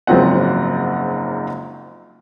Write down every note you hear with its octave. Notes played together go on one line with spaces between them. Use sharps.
F#1 G#2 F3 F#3 C4 F#5